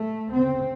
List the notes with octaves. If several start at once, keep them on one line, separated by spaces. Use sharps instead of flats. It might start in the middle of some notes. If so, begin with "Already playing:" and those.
Already playing: A3
D2 C#3 C4